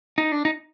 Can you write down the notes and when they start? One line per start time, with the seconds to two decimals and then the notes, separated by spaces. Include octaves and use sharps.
0.18 D#4
0.32 D4
0.45 D#4